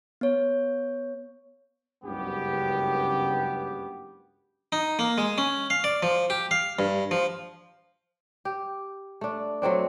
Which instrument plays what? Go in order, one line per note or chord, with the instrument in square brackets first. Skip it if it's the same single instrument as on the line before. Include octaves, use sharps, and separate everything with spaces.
[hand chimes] B3 C#5
[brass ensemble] F#1 C#2 G2 B3 G4
[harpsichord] D#4
A#3
G#3
C#4
F5
D5
F3
G4
F5
G2
F3
[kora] G4
A3 D4
F#3 A3 C4 D4